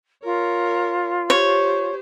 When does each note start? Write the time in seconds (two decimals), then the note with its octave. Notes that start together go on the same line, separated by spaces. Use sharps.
0.24 F4 A#4 C#5
1.30 G4 C5 C#5